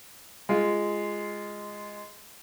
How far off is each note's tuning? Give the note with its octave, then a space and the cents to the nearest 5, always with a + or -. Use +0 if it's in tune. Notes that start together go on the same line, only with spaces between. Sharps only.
G#3 -5 F4 -10